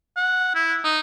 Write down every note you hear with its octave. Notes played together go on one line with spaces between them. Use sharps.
F#5
E4
D#4